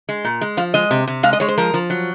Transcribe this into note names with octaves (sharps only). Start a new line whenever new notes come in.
G#3
A#2
G#3
F3 F5
G#3 D#5
C3
C3
G#3 F5
D#5
G#3 C#5
C5
F3 A#4
F3
F#3